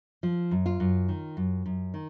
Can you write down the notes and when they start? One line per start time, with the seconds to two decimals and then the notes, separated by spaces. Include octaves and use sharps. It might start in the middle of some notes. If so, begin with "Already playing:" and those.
0.23 F3
0.51 F#2
0.66 F4
0.80 F#2
1.08 D#3
1.37 F#2
1.66 F#2
1.94 D#3